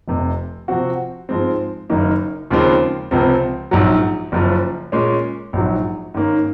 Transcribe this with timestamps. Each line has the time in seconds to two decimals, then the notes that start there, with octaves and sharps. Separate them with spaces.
0.08 F1 F2 C3
0.68 C3 F3 C4 F#4
1.29 G#2 F3 G#3 C4
1.90 F#1 F#2 D#3 A#3 D#4
2.50 D#2 C#3 F3 G#3 C4
3.11 C#2 C3 F3 C4
3.71 A#1 G#2 F#3
4.32 F#1 F#2 F3
4.92 A#2 G#3 C#4
5.53 A#1 G#2 F#3
6.14 G#2 D#3 A#3 C#4